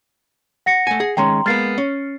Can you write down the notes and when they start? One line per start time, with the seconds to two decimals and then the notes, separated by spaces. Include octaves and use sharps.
0.66 F#5 A#6 C#7
0.87 A3 G#5
1.00 G#4
1.17 D#3 G#3 C#4 G5 A#5 C6
1.46 G#3 A#3 B3 F6 A6 C7
1.78 C#4